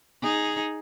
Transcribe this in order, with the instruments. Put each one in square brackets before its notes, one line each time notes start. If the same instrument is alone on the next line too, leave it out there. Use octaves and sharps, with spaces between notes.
[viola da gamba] D#4 G#4